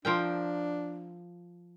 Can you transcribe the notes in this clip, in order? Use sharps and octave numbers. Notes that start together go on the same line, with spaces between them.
F3 D4 A#4 G5